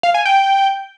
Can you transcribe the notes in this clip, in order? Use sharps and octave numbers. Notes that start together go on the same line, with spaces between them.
F5
G#5
G5